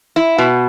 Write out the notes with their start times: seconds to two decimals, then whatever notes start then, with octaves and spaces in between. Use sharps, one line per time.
0.16 E4
0.38 B2